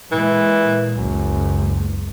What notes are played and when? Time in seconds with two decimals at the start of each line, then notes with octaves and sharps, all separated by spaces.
0.12 A#2 E3 G#3
0.97 F#1 C#2 F#2